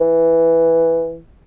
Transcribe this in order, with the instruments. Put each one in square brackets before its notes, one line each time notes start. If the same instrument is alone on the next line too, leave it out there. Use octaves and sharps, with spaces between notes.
[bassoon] E3